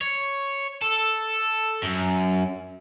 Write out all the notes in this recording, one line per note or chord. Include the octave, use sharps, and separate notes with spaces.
C#5
A4
F#2